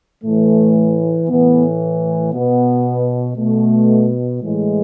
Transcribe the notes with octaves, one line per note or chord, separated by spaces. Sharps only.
A2 E3 A3
A2 E3 B3
B2 B3
B2 A3
A2 E3 G#3